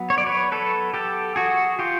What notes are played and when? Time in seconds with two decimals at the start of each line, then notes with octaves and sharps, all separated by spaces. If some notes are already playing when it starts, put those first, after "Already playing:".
Already playing: F#3 B3
0.10 C#5
0.18 D5
0.26 B4 C#5
0.52 A4 B4
0.94 G4 A4
1.36 F#4 G#4
1.79 F4 G4